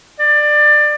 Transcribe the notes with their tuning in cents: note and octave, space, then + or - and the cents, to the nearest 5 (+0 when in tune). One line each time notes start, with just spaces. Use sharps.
D5 +20